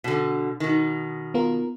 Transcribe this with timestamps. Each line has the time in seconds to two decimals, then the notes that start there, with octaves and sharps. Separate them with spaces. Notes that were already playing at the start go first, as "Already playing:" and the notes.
0.04 B2 D3
0.60 B2 D#3
1.34 B3 F4 A#4